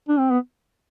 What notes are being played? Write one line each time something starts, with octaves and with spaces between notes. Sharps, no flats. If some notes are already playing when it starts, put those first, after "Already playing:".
D4
C4
B3